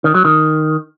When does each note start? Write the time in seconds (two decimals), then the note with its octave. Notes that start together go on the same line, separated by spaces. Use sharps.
0.04 D#3
0.14 F#3
0.25 D#3